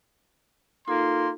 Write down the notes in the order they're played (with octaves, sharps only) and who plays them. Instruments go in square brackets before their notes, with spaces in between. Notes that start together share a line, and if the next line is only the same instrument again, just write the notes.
[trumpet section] A#3 C6 [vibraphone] D#4 F4 A4